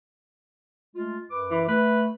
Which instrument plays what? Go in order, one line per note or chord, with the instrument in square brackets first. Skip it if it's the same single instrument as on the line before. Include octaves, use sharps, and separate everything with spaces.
[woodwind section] G#3 A3 F4
F#2 B4 D6
[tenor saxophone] E3
[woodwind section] A3 [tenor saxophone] B4